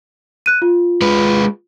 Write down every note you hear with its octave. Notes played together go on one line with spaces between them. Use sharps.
F#6 D#7
F4
G#3 B4